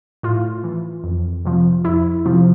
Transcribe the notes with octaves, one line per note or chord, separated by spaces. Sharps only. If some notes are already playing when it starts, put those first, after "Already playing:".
A2 F4
E3
F2
C3 F3
F2 E4
C3 F3